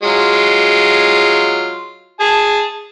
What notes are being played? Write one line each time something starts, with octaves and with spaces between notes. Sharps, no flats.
F#3 G#3 F4
G#4 G#5 A5